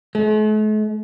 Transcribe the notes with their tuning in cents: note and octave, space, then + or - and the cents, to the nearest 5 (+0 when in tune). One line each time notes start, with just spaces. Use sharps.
A3 -45